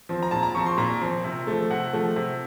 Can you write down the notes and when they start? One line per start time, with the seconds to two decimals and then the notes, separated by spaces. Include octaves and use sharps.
0.09 F3 C4
0.23 A#5
0.31 A#2 A5
0.43 A#5
0.55 F3 C4 C#6
0.66 C6
0.78 A#2 A#5
1.01 F3 C4
1.24 C3
1.47 F3 A3
1.70 C3 F#5
1.93 F3 A3
2.16 C3